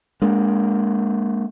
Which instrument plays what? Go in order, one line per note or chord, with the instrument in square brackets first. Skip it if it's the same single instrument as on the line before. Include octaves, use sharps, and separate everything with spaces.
[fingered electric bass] G#3 A#3 D4